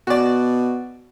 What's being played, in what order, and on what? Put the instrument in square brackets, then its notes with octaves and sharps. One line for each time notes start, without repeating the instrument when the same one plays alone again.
[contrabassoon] B2 [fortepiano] F#4 D5